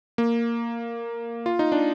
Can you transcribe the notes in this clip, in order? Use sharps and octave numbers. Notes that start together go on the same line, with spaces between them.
A#3
F4
D#4
D4